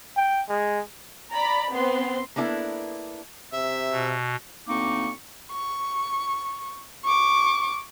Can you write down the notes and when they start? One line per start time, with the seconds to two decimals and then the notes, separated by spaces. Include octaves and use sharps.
0.17 G5
0.49 G#3
1.32 D5 A#5 B5
1.73 B3 C4 C6
2.36 A#3 B3 D4 E4 A4
3.53 C3 E5
3.90 B2
4.67 D2 A#3 C4 D#4 C#6 D6
5.52 C#6
7.05 C#6 D6